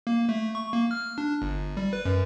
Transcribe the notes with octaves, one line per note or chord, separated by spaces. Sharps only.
A#3
A3
C#6
A#3
F6
D4
G1
G3
B4
F#2